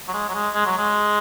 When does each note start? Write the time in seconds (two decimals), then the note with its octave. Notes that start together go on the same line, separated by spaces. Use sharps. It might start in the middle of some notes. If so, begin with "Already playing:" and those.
0.08 F#3
0.14 G#3
0.29 F#3
0.35 G#3
0.55 G#3
0.66 F#3
0.78 G#3